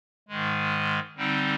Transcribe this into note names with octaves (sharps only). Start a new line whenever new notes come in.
G#2 D#3 G#3
D3 G3 C4 D#4